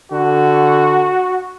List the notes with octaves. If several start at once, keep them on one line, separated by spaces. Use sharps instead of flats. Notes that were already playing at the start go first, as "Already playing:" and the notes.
D3 F#4